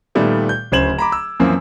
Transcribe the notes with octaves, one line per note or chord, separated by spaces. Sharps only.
A#2 D#3 G3 A3 B3
G6
D1 C#3 C5 G#6 E7 F#7
A#5 B5 D6
E6
F#2 E3 F3 A#3 C4